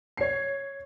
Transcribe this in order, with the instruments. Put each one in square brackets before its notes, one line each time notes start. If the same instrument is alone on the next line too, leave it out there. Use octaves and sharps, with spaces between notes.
[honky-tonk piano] C#5 C7